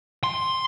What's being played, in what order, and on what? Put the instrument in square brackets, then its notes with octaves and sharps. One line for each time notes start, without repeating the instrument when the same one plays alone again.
[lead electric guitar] C6